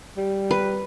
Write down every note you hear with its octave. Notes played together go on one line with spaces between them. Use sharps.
G3
B4